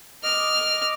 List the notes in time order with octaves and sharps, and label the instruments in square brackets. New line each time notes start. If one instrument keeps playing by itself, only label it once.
[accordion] D#5 D6 [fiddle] F6